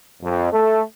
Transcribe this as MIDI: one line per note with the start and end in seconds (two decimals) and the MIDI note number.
0.22 0.52 41
0.52 0.81 57